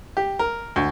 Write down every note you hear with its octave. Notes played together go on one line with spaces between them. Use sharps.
G4
A#4
D2